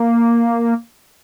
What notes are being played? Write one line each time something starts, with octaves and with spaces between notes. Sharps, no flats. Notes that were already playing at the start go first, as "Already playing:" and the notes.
Already playing: A#3